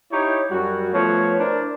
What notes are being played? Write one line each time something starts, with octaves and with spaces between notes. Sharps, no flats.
D#4 E4 G4 C#5
F#2 G3 F#4
F3 A3 B3 C#5
D4 E4 A#4 C5 D5